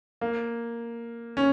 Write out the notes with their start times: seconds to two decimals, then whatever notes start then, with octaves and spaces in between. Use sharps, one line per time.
0.21 A#3
1.37 C#4